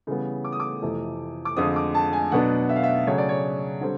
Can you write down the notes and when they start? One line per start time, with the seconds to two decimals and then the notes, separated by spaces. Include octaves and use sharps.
0.07 C#3 E3 G3 B3
0.44 D6
0.52 D#6
0.60 D6
0.82 F2 C3 E3 A3
1.45 D6
1.56 F2 D3 F3 G#3 C4 D#6
1.76 D6
1.94 A5
2.13 G#5
2.32 B2 F#3 B3 D4 F#5
2.69 E5
2.76 F5
2.83 E5
3.07 C#3 F#3 A3 C#5
3.18 D5
3.29 C#5
3.81 D3 G3 C4